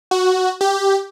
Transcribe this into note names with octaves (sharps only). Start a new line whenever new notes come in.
F#4
G4